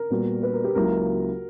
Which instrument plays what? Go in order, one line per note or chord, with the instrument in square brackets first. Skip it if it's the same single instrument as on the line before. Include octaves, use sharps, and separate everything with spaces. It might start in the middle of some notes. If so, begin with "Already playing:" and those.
Already playing: [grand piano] A#4
[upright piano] A#2 G3 B3 F#4
[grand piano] B4
A#4
G4
[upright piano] C#2 C#3 F#3 A#3 E4 [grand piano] A#4
[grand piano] F#4